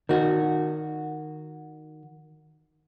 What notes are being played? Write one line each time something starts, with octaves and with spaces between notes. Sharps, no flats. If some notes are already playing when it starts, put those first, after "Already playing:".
D#3 F#4